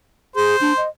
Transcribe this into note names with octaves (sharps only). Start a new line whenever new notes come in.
G#4 C5
D4
D#5